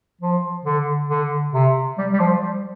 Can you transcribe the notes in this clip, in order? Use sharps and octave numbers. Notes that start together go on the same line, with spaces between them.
F3
D3
D3
C3
G3
G3
F3
G3